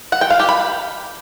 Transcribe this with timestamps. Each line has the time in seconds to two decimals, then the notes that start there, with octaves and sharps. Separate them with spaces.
0.12 F#5
0.21 G5
0.30 F5
0.40 G4
0.49 B5